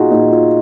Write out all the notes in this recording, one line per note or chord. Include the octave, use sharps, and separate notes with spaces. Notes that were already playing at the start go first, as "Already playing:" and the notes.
Already playing: A#2 D#4 F4 F#4 G#4
A#2 D#4
F4